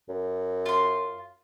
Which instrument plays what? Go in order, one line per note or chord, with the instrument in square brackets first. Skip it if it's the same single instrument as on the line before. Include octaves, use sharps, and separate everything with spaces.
[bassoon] F#2
[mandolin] F4 C6